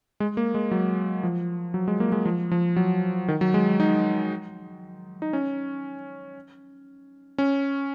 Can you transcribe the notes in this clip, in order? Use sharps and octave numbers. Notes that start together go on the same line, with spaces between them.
G#3
A#3
G#3
F#3
F3
F#3
G#3
A#3
G#3
F3
F3
F#3
D#3
F#3
G#3
D#4
D#4
C#4
C#4